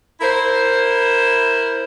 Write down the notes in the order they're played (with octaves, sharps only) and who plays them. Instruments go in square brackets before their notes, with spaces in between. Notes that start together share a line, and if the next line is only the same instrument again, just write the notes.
[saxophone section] E4 A#4 C5